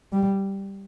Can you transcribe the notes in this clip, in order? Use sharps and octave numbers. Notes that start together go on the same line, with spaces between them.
G3